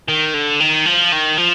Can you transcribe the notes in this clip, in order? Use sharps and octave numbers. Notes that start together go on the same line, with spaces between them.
D#3
D3
D#3
F3
D#3
F3